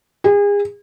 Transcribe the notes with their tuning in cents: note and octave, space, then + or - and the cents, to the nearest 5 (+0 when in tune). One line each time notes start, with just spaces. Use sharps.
G#4 -35